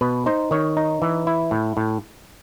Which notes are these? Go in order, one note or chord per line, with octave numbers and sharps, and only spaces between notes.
B2 B4
D#4 C5
D#3 C#5
D#4
E3
E4
A2
A2